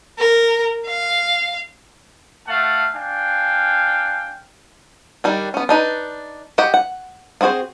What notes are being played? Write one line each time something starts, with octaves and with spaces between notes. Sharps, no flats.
A#4
F5
A3 F5 F#5 A5
D4 F5 G5 G#5
D#3 G3 D4
B3 C#4
D4 D#4 B4
F#4 G4 D#5 F#5
F#5
B3 C4 F#4 G#4 C5